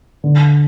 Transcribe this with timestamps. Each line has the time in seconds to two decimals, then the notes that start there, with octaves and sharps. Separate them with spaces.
0.24 D3